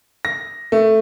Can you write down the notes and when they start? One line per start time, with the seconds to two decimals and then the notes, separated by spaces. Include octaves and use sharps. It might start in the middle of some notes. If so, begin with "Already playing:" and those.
0.25 A#6
0.72 A3